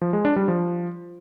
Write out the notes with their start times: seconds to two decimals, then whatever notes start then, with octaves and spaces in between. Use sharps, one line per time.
0.01 F3
0.13 G#3
0.25 D4
0.36 G3
0.48 F3